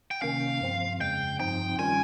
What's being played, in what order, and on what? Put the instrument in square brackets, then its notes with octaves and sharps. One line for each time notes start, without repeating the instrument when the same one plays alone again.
[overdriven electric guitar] G5
[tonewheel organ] C3 D#3 A#3 C#4 [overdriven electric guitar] F5
[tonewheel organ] G2 F3 C4
[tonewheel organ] F2 C#3 G#3 [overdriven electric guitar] G5
[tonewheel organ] G2 F3 C4 D#4 [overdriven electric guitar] G5
[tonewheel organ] D#3 G3 C#4 F4 [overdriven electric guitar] G#5